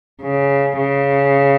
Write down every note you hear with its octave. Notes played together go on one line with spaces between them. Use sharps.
C#3
C#3